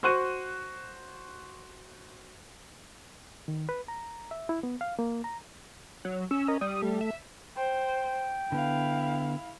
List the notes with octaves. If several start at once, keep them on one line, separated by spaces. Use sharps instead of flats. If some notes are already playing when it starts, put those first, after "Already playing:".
F#4 C5 C#6 F#6 D#7
D#3
B4
A#5
E5
E4
B3
F5
A#3
A#5
F#3
C#4 E6
A#4 D#5
G3 D#6
A3
E5
C5 G5
D3 B3 E4 F5